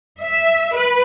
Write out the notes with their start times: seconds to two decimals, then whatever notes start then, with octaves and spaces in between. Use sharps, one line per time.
0.21 E5
0.74 B4